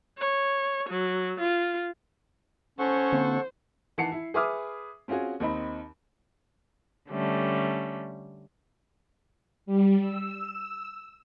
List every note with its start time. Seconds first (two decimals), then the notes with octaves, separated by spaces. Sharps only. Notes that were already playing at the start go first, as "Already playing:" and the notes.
0.18 C#5
0.89 F#3
1.40 F4
2.79 C#4 A4 C5 F#5 C#6
3.12 D3 A#3 C4
3.98 D#3 E3 F#5 A5 C7 C#7
4.12 E4
4.34 G#4 B4 E5 D6 D#6 F6
5.08 C4 C#4 F4 F#4 G#4
5.40 D#2 C4 D#4 B5
7.09 D3 G3 A3 C#4
9.66 G3
10.01 E6